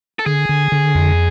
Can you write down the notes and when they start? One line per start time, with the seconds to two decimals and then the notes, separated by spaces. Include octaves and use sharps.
0.19 A4
0.26 D3 G#4
0.49 D3
0.72 D3
0.95 F2